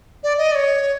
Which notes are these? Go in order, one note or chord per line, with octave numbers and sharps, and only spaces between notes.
D5
D#5
D5
C#5